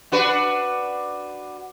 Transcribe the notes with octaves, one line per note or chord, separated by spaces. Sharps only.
D4 F#4 B4